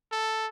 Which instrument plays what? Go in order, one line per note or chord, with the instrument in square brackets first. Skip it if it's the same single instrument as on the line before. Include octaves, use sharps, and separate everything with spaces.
[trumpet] A4